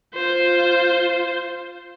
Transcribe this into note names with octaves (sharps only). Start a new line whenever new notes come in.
F4 C5